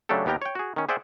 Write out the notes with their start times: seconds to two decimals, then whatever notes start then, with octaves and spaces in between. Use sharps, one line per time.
0.09 C#3 F#3 A3 D4 G4 A4
0.26 D#2 B3 G4 A#4 G5 A#5
0.42 C#5 G5
0.55 F#4 G#4
0.76 D#3 C#4
0.89 G#4 C5 D5 E5 F#5 G5